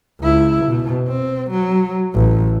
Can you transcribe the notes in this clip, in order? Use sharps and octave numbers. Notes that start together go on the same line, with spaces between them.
C#2 E4
B2
C4
F#3
A1